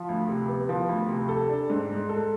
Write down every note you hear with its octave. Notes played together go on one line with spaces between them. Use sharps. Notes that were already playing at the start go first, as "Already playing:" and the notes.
Already playing: F3
D2
C3
B3
F3
D2
C3
A4
D4
G#2
G#3
A4